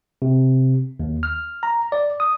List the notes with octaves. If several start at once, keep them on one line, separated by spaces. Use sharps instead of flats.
C3
D#2
F6
A#5
D5
D#6